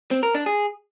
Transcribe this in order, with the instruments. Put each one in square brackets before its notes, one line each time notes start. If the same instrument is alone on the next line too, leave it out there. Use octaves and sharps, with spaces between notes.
[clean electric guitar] C4
A#4
D4
G#4